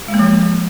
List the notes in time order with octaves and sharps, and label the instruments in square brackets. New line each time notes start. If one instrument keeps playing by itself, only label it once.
[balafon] G#3
A#3
F3